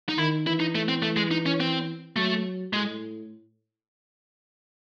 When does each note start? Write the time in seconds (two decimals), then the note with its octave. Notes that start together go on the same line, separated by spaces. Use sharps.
0.09 D#4
0.18 D#3 E4
0.46 E3 E4
0.60 D#4
0.75 A3
0.88 C4
1.02 A3
1.16 G#3
1.31 D#4
1.46 C#4
1.60 C4
2.16 F#3 A3
2.73 A2 G#3